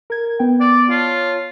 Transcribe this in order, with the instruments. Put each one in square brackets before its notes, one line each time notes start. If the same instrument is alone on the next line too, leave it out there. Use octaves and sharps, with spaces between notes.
[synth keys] A#4 G#6
B3 G5
[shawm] D5
[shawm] F4 [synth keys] C#5 A5